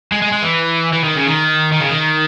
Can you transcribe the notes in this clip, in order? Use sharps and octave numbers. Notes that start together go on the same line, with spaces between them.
G#3
G#3
G#3
E3
E3
D#3
C#3
D#3
D#3
C#3
D#3